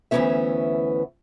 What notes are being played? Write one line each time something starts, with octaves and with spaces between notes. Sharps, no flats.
D2 E3 F#3 B3 C#4 E5